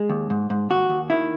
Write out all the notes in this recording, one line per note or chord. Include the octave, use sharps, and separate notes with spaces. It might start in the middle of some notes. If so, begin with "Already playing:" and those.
Already playing: G#3 G#4
D#2
G#2
G#2
D#2 F#4
D#2
D#3 E4